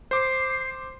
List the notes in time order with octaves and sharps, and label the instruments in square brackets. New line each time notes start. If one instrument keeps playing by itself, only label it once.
[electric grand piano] C5 D6 [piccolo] C7